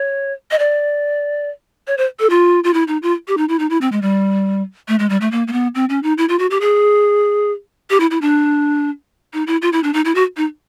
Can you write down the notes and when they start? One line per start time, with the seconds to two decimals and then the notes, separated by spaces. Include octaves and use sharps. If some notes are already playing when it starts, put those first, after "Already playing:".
Already playing: C#5
0.51 D#5
0.59 D5
1.87 C#5
1.98 C5
2.20 A4
2.30 F4
2.64 F4
2.74 E4
2.88 D#4
3.03 F4
3.28 G4
3.37 D#4
3.49 E4
3.59 D#4
3.70 E4
3.81 C4
3.92 G#3
4.02 G3
4.88 A3
4.99 G#3
5.10 G3
5.21 A3
5.32 A#3
5.48 A#3
5.53 B3
5.75 C4
5.89 C#4
6.03 D#4
6.18 E4
6.29 F4
6.39 F#4
6.51 G4
6.61 G#4
7.90 G4
8.00 E4
8.11 E4
8.22 D4
9.34 D#4
9.47 E4
9.62 F4
9.73 E4
9.84 D4
9.94 D#4
10.05 E4
10.15 F#4
10.37 D#4